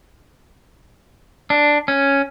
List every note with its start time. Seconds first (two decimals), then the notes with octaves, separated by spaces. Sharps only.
1.50 D4
1.88 C#4